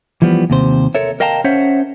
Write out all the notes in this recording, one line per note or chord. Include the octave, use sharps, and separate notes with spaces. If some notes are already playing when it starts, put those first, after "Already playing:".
E3 F3 G3 B3
D#2 C3 C5
A4 A#4 C#5 E5
A#4 D#5 F5 G5 A5 A#5
C#4 C5 C#5 E5 F#5